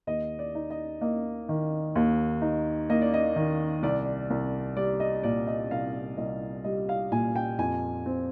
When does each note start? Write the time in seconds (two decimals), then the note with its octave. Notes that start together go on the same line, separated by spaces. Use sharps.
0.07 D#2 D#5
0.39 D5
0.55 D#4
0.70 D#5
1.01 A#3 D#5
1.49 D#3
1.96 D#2
2.42 D#4
2.89 A#3 D#5
3.02 D5
3.14 D#5
3.36 D#3
3.83 C2 D5
4.30 C2
4.77 G3 D5
5.00 D#5
5.23 A#2 D5
5.47 D#5
5.71 C2 F5
6.17 C2 D#5
6.64 G3 D#5
6.89 F5
7.12 A#2 G#5
7.36 G5
7.58 F2 G#5
8.06 C4